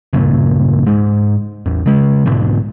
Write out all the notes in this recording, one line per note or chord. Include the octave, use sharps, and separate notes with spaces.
C#2 G2 A#2 C#3
G#2 G#3
A1 E2
C#3 G#3
B1 G#2 B2 D3